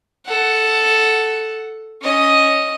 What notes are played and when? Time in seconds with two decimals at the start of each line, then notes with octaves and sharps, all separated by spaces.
0.26 A4 F#5
2.02 C#4 D#5